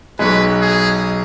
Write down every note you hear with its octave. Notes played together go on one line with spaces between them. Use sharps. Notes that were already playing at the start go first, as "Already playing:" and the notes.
B1 B2 G#3 B4
G#4